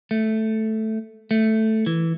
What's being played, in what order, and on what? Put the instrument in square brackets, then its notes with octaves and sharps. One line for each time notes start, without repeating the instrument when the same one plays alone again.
[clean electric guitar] A3
A3
E3